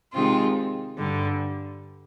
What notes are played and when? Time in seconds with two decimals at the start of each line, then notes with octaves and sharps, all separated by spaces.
0.14 C3 D#3 G#3 C4 F4
0.97 G2 D3 G3